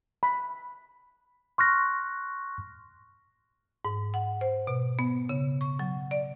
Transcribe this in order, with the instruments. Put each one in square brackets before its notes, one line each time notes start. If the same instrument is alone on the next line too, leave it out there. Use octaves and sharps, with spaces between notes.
[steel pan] B5
[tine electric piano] C6 C#6 F6 F#6 A#6
[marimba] G#2
F#5
C5
B2
B3
C#3
C#6
F#3
D5